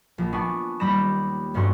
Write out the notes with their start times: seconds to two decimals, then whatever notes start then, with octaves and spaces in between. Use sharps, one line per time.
0.18 A#1
0.33 B3 D4 G#5 C#6
0.80 D#2 G3 B5 G6 A#6 E7
1.54 F1 G2 C#4 F#4 C6 C#6